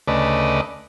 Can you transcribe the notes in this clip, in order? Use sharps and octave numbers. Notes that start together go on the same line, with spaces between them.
D2 C#3 A3 B4 D5 D#5